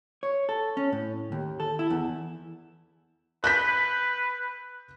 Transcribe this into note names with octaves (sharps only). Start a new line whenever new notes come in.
C#5
A4
C#4
A2
D#2
A4
E4
E2
B4 F#6 G6 B6